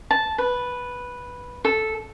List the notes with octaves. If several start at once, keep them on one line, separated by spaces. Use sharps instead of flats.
A5
B4
A4